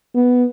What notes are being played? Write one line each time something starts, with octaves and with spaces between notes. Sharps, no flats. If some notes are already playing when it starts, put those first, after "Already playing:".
B3